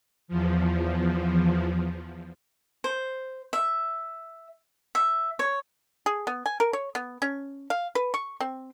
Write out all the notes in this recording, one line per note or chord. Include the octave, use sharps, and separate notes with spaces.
E2 F3
C5
E5
E5
C#5
G#4
B3
G#5
A#4
C#5
B3
C#4
F5
B4
C#6
C4